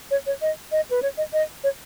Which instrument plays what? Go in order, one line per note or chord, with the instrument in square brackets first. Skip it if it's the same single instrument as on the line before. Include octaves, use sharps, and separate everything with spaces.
[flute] C#5
C#5
D#5
D#5
B4
C#5
D#5
D#5
C#5